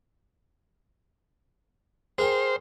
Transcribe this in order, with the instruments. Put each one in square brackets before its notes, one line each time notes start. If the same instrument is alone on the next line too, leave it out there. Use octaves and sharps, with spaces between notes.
[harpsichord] G#4 A#4 G5 [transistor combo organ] C5